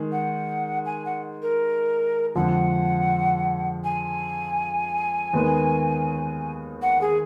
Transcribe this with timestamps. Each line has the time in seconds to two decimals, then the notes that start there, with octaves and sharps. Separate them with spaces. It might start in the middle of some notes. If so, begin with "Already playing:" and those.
Already playing: D#3 G#3 D#4
0.12 F#5
0.85 G#5
1.05 F#5
1.42 A#4
2.35 F2 D3 F3 G#3 F#5
3.84 G#5
5.33 D#2 D#3 G#3 B3
6.82 F#5
7.01 G#4